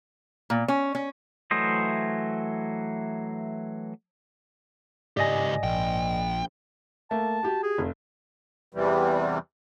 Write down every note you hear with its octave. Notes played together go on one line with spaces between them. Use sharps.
A#2
C#4
C#4
E3 F#3 A3 C5 D#5
C#2 G#2 G4 D5 D#5 G#5 A#6
A#1 G5
A3 A#3 A5
F#4 G4
G#4
F1
E2 C3 E3 G3